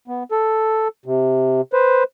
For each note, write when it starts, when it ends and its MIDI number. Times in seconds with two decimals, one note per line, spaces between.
0.08 0.23 59
0.32 0.88 69
1.06 1.61 48
1.73 2.03 71
1.73 2.03 72